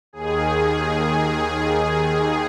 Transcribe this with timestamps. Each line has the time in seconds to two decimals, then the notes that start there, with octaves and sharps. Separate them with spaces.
0.13 D#2 D#3 G#4
0.59 G#4